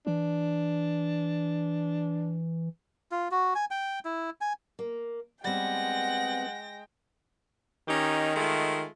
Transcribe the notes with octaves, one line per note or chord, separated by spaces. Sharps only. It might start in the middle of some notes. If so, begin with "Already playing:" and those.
E3 D4
F4
F#4
G#5
G5
E4
G#5
A#3
G3 G#3 B3 C4 F#5 G5 A#6
D#3 C#4 D#4 G4
G#3 A3 F4